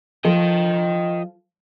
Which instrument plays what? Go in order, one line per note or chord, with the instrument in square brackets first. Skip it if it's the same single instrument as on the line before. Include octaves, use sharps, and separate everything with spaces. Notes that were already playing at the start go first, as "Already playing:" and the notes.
[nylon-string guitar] F3 A4 [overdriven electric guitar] D#5 G5